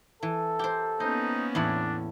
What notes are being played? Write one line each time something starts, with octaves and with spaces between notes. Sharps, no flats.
E3 A4
G4 A#4 C5
A#3 B3 C#4 D#4 C5
E2 A2 D4 E4